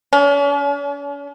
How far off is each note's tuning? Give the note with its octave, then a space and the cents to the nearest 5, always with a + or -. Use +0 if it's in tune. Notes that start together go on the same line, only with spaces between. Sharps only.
C#4 +45